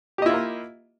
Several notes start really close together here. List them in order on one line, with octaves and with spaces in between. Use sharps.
G4 D#5 E4 F4 A#3